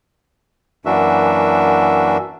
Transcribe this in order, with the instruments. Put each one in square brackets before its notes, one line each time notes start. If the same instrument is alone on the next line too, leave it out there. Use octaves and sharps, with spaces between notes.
[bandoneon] F#2 E3 A#3 D4 F#4 E5